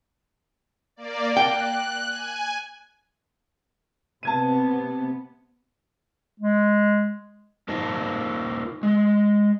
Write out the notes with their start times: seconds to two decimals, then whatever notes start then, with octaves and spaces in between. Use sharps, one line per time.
0.96 A#3 D5
1.37 G5 F#6
2.10 G#5
4.23 C3 B3 A5 G#6 D#7
6.40 G#3
7.69 A#3 D#4 F4 A#4 C5 A5
8.83 G#3